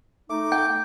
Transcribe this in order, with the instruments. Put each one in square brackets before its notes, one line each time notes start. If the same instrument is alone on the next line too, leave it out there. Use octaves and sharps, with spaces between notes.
[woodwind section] A3 D#4 [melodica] D6
[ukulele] G5 [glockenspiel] G6